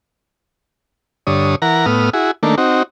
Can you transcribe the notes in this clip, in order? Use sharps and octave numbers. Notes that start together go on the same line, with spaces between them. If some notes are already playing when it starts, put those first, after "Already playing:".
G2 D3 C#5 D#6
E3 A#4 F#5 A#5
A2 B3 D#6 F6
E4 F#4 G#4
D#3 A3 A#3 D4
C4 D#4 F#4